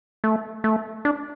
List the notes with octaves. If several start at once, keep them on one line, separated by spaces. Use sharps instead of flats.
A3
A3
D4